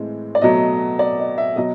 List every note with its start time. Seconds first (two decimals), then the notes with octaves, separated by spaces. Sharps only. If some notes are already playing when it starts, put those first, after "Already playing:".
Already playing: A2 E3 G#3 C4
0.35 D5
0.42 B2 F#3 A3 D#5
0.99 D5
1.19 D#5
1.38 E5
1.56 B2 F#3 D#5